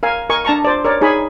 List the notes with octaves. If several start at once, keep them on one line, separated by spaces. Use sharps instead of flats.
A#4 F5 G#5
A#4 D#5 G#5 C#6
D4 A5 A#5 C#6
C5 D5
A#4 C#5 D5
D#4 G#4 C#5 G#5 B5